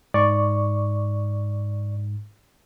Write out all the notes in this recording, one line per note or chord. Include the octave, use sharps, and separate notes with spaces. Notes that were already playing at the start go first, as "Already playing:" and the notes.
G#2 D5 C#6